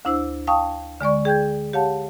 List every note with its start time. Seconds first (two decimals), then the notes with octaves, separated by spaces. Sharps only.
0.05 D2 D4 E4 C5 E6
0.47 F5 G5 A5 C#6 D#6
1.01 D3 G#3 D5 C#6
1.25 G#4 G5 G6 G#6
1.73 G4 C#5 F5 F#5 A5